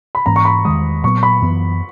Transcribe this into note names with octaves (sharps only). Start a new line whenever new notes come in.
B5
G#2 E3 A#3 C#4 A#5
C#6
B5
E2 D#3 G#3 D#6
A#2 F#3 B3 C#6
B5
F#2 E3 B3